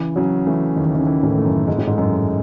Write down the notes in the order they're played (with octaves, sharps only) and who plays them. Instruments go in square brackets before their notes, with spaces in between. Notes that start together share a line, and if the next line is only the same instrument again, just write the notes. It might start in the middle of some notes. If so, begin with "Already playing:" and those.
Already playing: [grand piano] C#3 [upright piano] E3
[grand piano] C#3 [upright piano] F#3
[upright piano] E3 [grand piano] A3
[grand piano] D#2 [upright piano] D#3
[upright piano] D#3
C#3
[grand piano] E3
[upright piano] A2
[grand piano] A3
[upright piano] F#2
[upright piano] G#2 [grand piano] G#3
[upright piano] A2
G#2
[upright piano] F#2 [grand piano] G#3